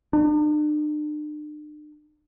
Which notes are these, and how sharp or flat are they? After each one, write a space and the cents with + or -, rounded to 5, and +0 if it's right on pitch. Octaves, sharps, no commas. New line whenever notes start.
D4 +45